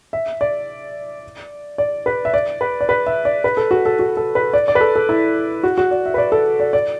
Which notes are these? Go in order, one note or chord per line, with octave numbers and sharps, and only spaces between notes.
E5
D5
D5
B4
E5
D5
B4
D5
B4
E5
D5
B4
A4
F#4
A4
F#4
A4
B4
D5
D5
B4
A4
A4
E4
F#4
F#4
D5
E5
B4
D5
A4
D5
D5